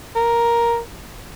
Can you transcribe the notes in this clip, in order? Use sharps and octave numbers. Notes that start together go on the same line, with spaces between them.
A#4